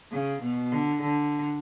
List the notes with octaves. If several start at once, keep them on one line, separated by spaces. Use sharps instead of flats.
C#3
B2
D3
D3